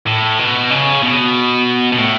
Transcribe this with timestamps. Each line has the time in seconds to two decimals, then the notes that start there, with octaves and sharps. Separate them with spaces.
0.07 A2
0.39 B2
0.70 C#3
1.03 B2
1.92 B2
1.98 A2